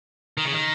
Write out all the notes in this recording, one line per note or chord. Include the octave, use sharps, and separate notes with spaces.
D#3
C#3
D#3